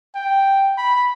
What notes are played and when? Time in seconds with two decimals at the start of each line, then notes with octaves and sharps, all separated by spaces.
0.15 G5
0.78 B5